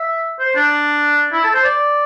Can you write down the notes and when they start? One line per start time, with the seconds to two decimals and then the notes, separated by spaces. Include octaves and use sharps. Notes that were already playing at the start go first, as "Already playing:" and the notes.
Already playing: E5
0.39 C5
0.56 D4
1.33 E4
1.44 A4
1.54 C5
1.64 D5